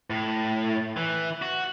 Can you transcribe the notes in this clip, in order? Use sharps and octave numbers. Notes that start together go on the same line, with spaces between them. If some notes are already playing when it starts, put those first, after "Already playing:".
A2
E3
F#4